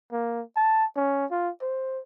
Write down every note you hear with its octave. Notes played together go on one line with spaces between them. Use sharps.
A#3
A5
C#4
F4
C5